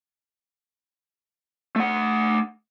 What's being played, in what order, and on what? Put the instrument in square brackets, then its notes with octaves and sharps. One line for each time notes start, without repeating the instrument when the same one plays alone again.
[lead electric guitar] A3 F#5